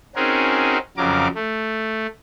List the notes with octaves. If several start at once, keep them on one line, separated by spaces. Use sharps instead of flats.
C4 C#4 D#4 F#4 G#4 A#4
F2 C#3 F#3 A#4 D6
A3